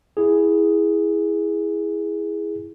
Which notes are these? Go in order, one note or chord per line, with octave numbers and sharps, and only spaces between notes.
E4 G#4